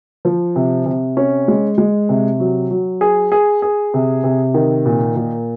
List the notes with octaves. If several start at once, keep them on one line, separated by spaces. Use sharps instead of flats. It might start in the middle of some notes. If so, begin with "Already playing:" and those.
F3
C3
C3
C#4
G#3
G#3
C3
F#3
F#3
G#4
G#4
G#4
C3
C3
D#3
A#2
A#2